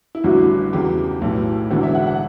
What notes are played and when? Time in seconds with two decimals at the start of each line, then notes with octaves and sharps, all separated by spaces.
0.15 E4
0.24 A1 G2 D3 F#3 F#4
0.73 E2 C#3 F#3 G4
1.21 B1 A2 E3
1.70 E1 E2 D3 F#3
1.83 E5
1.95 F#5
2.07 F#5